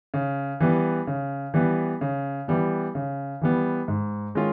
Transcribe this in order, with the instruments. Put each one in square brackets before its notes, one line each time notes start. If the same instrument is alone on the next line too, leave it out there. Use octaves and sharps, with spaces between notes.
[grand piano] C#3
E3 G3 B3
C#3
E3 G3 B3
C#3
E3 G3 B3
C#3
E3 G3 B3
G#2
D#3 G#3 C#4 F4